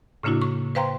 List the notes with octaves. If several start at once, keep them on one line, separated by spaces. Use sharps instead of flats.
A2 C#3 A#3 D4 E4 F#4
C#6
B4 C5 F5 G5 A#5 C6